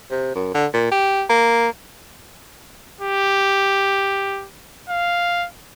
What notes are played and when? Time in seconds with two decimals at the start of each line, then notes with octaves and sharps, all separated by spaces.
0.11 C3
0.35 F#2
0.54 D3
0.74 A#2
0.92 G4
1.29 A#3
3.01 G4
4.90 F5